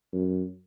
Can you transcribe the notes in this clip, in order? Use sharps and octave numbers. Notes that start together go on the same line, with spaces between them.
F#2